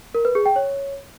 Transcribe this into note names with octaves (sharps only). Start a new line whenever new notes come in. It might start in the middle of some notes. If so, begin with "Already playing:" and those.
A#4
B4
G#4
G5
C#5